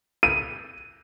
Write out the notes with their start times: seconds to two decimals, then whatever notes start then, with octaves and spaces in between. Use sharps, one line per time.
0.23 D#7